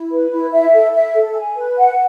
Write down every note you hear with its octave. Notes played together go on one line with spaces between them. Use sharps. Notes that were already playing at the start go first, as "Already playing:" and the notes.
Already playing: E4
B4
E4
E5
A4
E5
A4
G#5
B4
F#5